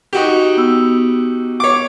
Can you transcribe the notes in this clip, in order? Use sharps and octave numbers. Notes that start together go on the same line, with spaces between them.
D#4 F#4 G4
B3 E6
C#5 D6